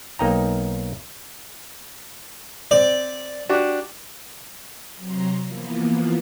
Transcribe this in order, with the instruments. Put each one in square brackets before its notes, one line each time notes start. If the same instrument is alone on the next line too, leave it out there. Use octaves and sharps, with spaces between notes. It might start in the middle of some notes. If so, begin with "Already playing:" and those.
[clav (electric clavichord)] B1 A#3 D#4 D#5 G5 A#5
[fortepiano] C4 [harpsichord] D5
[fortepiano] D4 F#4 G4
[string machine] C3 F#3 A#5 C6
E3 F3 A#3 B3